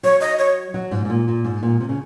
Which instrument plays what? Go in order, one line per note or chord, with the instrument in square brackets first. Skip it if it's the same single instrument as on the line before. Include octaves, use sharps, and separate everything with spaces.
[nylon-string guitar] F#3 [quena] C#5
[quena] D#5
C#5
[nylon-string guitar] F#3
G#2
G#2
A#2
A#2
G#2
A#2
C3
C#3